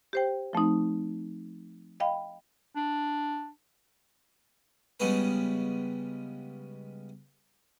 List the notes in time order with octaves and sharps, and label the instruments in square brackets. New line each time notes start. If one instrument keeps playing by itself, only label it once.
[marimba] G4 C5 G5
F3 A3 C4 D#4
D#5 F5 G5 B5
[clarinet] D4
[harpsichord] C#3 G3 G#3 B3 C#4 B4